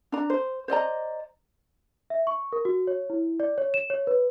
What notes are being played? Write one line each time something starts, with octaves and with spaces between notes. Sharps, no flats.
D4 A#5
C5
C5 D5 D#5 A#5
E5
C#6
A#4
F#4
C#5
E4
D5
C#5
E7
C#5
B4